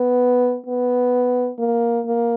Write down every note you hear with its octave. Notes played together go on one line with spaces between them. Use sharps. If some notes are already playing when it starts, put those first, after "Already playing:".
Already playing: B3
B3
A#3
A#3